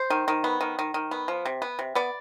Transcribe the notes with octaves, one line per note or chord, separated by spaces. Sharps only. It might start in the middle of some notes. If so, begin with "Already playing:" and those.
Already playing: C5
D#3
D#3
B3
D#3
D#3
D#3
B3
F3
C3
B3
C3
B3 D5